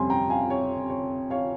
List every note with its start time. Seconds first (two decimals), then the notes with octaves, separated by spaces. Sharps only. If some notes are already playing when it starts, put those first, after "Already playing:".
Already playing: F2 C3 G3 C#4 G#5 C6
0.10 G5 A#5
0.30 F5 G#5
0.50 C#5
0.90 C#5
1.30 C#5 F5